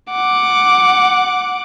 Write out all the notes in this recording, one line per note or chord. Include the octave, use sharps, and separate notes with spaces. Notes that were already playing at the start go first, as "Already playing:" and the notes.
F#5 D6